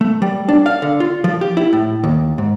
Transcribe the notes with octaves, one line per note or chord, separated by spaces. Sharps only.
A3
G3
D4
F5
D3
F4
F3
G4
E4
A2
D#2
G#2